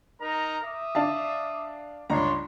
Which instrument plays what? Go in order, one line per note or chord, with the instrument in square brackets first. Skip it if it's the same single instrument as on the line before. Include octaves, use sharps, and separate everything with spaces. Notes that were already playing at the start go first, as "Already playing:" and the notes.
[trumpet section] D#4 A#4 A#5
E5 D6 D#6
[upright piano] D4 F5 A5
[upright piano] C#2 G2 A#5 [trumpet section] D4 C#5 C6